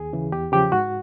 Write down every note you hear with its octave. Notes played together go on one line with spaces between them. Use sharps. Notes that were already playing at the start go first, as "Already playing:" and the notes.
Already playing: D#2 G#4
C#3 E3
E2 G4
C#3 F3 G4
G#2 F#4